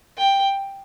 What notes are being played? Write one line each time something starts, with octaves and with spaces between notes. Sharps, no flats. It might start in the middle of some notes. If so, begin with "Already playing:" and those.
G5